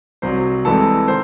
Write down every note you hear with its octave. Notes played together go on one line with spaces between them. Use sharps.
C2 C3 F#3 C5
C2 C3 E3 G#3 A4
D#3 C5